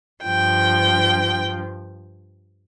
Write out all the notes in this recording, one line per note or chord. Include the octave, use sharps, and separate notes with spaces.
G2 F3 G5